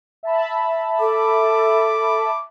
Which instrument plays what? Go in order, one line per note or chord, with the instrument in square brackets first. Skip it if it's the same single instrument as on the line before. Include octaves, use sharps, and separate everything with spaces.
[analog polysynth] E5 A5 B5
[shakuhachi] A4 [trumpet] D6